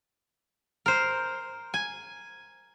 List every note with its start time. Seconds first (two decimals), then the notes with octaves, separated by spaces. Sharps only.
0.86 A#4 C5
1.74 G#5